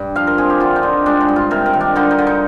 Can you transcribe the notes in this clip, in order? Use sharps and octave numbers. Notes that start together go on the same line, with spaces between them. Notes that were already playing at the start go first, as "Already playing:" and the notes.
Already playing: G2
F3 F5
A#4
C4 G#4
G4
D3 F4
D#4
D3
G#3 D4
D#4
G2
F4
C3 A#4
A#4
D#3
D4
D3 D#4
D#4
D3
D#4